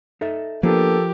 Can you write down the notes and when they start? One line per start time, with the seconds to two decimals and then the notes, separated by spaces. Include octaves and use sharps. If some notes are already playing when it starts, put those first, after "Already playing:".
0.21 D#4 A4 E5
0.63 F3 A#3 B3 D4 G4 A4 A#4